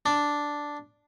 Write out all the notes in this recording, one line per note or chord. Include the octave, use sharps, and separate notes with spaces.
D4